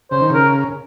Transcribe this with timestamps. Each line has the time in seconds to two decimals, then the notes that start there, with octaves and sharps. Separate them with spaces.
0.11 C#3 C5
0.22 D#3
0.30 C#3 A#4